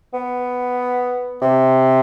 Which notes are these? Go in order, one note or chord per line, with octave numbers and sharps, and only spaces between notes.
B3
C3